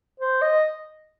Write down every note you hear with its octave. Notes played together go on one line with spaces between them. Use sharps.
C5
D#5